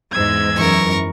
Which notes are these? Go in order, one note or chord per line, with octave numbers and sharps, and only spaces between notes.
E2 G#2 E6 G#6
F#2 E3 A#4 C#6